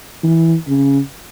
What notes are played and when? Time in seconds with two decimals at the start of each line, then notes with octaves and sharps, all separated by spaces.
0.23 E3
0.67 C#3